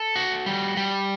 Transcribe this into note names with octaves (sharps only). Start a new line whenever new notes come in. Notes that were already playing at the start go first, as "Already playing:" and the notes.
Already playing: A4
F#4
G3
G3